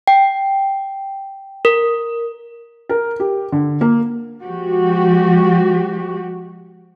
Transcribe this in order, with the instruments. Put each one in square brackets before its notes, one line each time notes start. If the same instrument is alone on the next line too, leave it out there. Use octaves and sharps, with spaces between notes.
[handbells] G5
A#4
[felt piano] A#4
G4
D3
A#3
[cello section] F3 G#3 F#4 G4